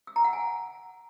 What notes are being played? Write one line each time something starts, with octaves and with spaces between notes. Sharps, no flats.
E6
A#5
F#5
G#5